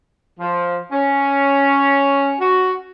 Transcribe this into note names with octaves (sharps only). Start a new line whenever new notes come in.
F3
C#4
F#4